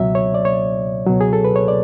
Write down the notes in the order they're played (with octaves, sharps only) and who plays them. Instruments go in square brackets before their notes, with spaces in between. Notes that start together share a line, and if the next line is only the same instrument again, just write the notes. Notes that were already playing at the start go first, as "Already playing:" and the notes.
Already playing: [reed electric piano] C#2 B2 F#3 E5
C#5
D5
C#5
C#2 B2 F#3
G#4
A4
B4
C#5
D5